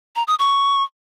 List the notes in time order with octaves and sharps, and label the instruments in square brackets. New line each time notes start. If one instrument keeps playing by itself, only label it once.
[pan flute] A#5
D#6
C#6